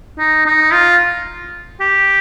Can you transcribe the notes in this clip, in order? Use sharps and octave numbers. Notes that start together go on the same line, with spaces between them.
D#4
D#4
F4
G4